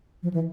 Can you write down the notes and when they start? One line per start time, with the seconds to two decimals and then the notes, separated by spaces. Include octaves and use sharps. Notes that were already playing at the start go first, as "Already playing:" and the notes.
0.23 F3
0.34 E3